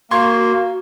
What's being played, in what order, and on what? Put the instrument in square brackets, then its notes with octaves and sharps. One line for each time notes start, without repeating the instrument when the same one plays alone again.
[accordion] A#3 [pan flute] F#4 [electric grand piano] C6 C#6 G#6